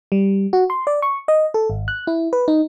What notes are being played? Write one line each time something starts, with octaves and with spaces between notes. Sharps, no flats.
G3
F#4
C6
D5
C#6
D#5
A4
G#1
F#6
E4
B4
D#4